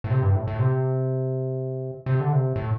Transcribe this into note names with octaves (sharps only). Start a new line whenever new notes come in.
A2
C3
G2
A2
A2
C3
C3
D3
C3
A2